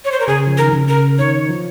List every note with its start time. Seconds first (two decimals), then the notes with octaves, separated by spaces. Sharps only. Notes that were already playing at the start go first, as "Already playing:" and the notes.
0.05 C#5
0.12 C5
0.20 A#4
0.27 C#3 G#4
0.47 F3
0.58 D#3 A#4
0.73 C#3
0.89 A#4
1.18 D#3 C#5
1.49 F3